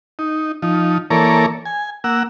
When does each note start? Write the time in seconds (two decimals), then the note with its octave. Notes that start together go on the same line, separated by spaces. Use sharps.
0.19 D#4
0.62 F3 D#4
1.10 E3 A#3 A4 A#4 C#5 D5
1.65 G#5
2.04 A#3 F#5 E6